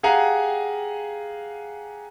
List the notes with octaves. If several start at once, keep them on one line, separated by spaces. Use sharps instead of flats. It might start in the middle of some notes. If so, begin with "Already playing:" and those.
G4 G#4 F5 F#5 G#5 A#5